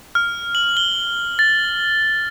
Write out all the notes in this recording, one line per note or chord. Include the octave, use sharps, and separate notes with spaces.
F6
F#7
G7
A6